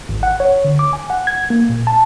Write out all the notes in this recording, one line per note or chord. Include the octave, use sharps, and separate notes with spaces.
G#1
F#5
C#5
D3
D6
G#5
F#5
G#6
A#3
A#2
A5